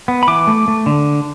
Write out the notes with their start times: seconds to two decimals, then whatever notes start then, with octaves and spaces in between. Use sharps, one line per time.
0.08 B3
0.23 B5
0.28 E3 D6
0.47 A3
0.68 A3
0.86 D3